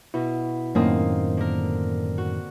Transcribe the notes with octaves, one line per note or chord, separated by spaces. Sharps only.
B2 E4
F#2 A2 D#3 A#3 C4 D#5
D3 A#4
F#4